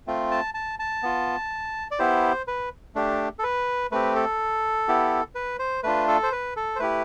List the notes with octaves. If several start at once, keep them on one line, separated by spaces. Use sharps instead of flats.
A3 C4 F4
A5
A5
A5
B3 F4
D5
B3 E4 G4 C5
B4
A3 D4 G4
A4
B4
A3 C4 G4 B4
A4
B3 E4 G4
B4
C5
A3 D4 F4 B4
A4
C5
B4
A4
C5
A3 E4 G4 B4